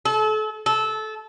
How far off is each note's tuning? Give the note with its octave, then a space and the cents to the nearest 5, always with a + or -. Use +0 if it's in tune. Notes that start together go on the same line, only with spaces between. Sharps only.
A4 -35
A4 -20